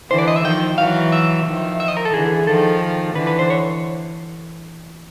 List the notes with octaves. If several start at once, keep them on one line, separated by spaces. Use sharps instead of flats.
D3 E3 C5
D5
D#5
E5
D#3 F3 G5
E3 F#3 F5
E5
D#3 F3
E5
D#5
A#4
A4
D3 E3 G#4
D#3 F3 A4
D3 E3 B4
B4
C5
C#5